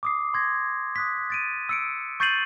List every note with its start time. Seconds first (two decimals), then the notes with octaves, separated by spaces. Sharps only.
0.03 D6 D#6 C7
0.34 C6 G#6 A#6
0.96 D#6 F#6 B6
1.30 A6 D7 D#7
1.69 E6 C#7 D7
2.20 C#6 G6 A6 C7 D#7 F#7